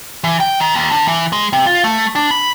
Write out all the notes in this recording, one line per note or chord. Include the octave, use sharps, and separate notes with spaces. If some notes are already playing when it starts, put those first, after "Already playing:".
E3
G5
D#3
D#2
D3
E3
G#3
C3
F4
A3
D4
B5